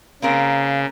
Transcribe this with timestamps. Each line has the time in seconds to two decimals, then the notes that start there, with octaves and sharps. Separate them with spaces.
0.22 C#3 A#3 C4 A#4 F5